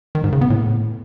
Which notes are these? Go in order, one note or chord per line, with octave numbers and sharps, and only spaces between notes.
D#3
G#2
C#3
B3
A2